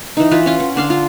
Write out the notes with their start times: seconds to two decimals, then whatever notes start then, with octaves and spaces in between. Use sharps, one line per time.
0.17 E3 D#4
0.31 E3 F4 B4
0.46 C#4 F4
0.60 F#5
0.76 D3 D4 F5 C6
0.90 F4